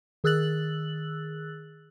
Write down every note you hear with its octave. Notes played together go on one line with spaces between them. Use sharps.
D#3 G#4 E6 F#6 A6 F#7